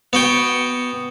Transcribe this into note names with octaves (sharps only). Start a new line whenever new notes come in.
B3 F#4 G5